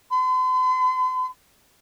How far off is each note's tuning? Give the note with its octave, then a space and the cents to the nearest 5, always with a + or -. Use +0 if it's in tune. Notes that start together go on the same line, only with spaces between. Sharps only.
C6 -45